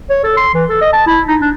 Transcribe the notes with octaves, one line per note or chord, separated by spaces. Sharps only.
C#5
A4
C6
E3
A4
D#5
A5
E4
D#4
D4